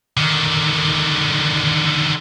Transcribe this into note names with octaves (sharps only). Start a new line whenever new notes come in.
D3 D#3